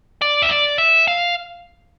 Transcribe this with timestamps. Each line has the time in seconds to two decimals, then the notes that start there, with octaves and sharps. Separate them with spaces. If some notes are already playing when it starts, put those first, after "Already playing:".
0.22 D5
0.42 E5
0.50 D5
0.78 E5
1.08 F5